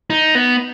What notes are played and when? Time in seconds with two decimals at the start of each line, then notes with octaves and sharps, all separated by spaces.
0.10 D#4
0.35 B3